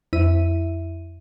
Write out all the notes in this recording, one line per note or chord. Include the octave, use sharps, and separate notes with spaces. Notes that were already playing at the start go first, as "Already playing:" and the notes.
F2 E4 E5 D#7